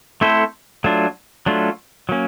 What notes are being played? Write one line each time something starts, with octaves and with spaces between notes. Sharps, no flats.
A3 C4 E4 A4 C5
F#3 A3 D4 F4
F#3 A3 D4 F4
F#3 A#3 C#4